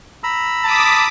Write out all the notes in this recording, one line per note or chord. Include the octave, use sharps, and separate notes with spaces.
A#5 B5 E6
A5 D6 D#6 B6